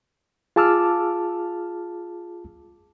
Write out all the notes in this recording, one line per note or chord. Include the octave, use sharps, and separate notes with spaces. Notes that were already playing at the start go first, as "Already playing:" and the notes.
F4 G#4 A5 D6 E6 F6